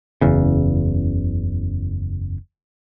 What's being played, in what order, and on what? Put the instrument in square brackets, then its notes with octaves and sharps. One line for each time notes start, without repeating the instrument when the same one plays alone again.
[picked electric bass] F#1 E2 C#3